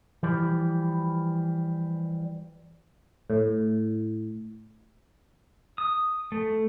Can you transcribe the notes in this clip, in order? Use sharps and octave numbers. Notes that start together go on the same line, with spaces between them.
E3 F3 G3
A2
D#6
A3